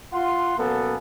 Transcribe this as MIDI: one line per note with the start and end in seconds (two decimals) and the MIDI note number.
0.12 0.56 65
0.12 0.56 78
0.12 0.56 84
0.57 0.96 47
0.57 0.96 54
0.57 0.96 58
0.57 0.96 59
0.57 0.96 61
0.57 0.96 69